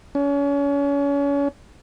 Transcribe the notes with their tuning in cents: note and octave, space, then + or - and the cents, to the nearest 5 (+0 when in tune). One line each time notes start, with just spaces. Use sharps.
C#4 +35